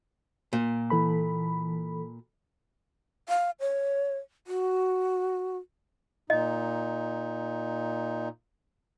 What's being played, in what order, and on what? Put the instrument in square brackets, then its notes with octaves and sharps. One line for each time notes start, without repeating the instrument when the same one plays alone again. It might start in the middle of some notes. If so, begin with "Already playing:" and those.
[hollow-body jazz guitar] A#2
[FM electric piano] E3 A4 B5
[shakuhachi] F5
C#5
F#4
[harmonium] A#2 D#4 [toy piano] D#5